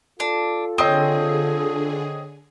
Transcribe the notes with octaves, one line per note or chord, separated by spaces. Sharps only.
D4 F4 A4
D3 C4 G#4 C#5 D#5 D#6